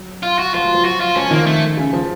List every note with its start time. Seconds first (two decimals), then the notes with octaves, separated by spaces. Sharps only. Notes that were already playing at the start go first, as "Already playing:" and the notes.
Already playing: F#3
0.23 F4
0.39 F#4
0.54 F3 F4
0.64 F#3
0.74 F3
0.85 F#4
1.01 F4
1.15 F3 C#4
1.31 D#3 A#3
1.46 A3
1.77 C#3
1.93 F3